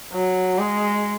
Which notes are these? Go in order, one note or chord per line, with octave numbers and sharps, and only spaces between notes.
F#3
G#3